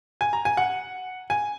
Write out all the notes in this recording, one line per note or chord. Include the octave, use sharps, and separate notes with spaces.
G#5
A#5
G#5
F#5
G#5